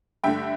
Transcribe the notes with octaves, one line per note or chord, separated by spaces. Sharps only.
G2 D3 A3 E5 G5